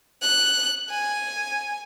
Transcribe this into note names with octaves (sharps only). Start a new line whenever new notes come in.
F#6
G#5